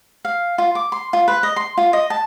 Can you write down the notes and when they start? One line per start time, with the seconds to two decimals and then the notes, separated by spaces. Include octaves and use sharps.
0.25 F5
0.58 F4
0.75 D6
0.92 C6
1.13 F4
1.28 B4
1.43 D#5
1.56 C6
1.78 F4
1.93 D#5
2.10 A5